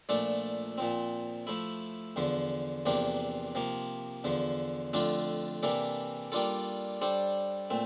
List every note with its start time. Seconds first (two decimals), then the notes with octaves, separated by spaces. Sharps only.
0.09 A#2 F3 A3 D4 A4
0.78 A#2 F3 C4
1.47 F3 A3 E4
2.16 E2 D3 F3
2.85 E2 C3 F3 A#3 D4
3.55 C3 F3 A#3
4.24 E2 D3 F3
4.93 F2 D3 A3 D4 F4
5.63 C3 E3 A#3 D4 A4
6.32 G3 A#3 D4 F4 A4
7.01 G3 D4 A4 C5
7.70 A#2 A3 C4